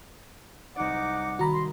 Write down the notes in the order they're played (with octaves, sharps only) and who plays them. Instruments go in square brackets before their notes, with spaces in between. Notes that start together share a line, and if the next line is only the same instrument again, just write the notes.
[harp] C2 D5 [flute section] D#4 F#5 D6
[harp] D#3 [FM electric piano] F#4 A#5 B5
[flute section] C6